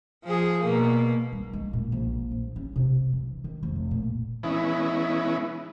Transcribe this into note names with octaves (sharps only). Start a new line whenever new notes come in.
F3 G#4
B2 A#3
G3
G#3
A#2
A#1
F3
C#4
C3
E3
D#3
F1
A#2
E3 G#3 B3 C#4 D#4 E4